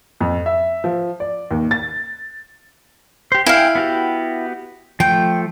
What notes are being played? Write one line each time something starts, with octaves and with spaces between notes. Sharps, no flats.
F2
E5
F3
D5
D#2
A6
G4 C5
E4 F5 G5 G#5
B3 F#4 G4
F3 A3 G5